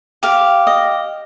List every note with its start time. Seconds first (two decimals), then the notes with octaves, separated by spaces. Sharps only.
0.23 G4 F5
0.67 D#5